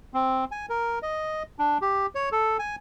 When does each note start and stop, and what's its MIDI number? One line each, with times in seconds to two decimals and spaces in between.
0.14 0.45 60
0.51 0.66 80
0.69 0.99 70
1.02 1.43 75
1.59 1.78 62
1.82 2.06 67
2.15 2.29 73
2.32 2.57 69
2.59 2.76 80